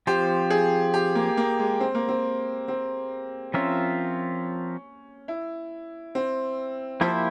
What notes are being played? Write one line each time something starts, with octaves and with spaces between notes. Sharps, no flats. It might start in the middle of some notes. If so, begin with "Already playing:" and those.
F3 C4 F4 G4 C5
G#4
G4
A#3
A#3
G#3
C4
A#3
C4
C4
F3 C4 C#4 F4 A#4 E5
E4
C4
F3 A#3 E4 G4 C5 E5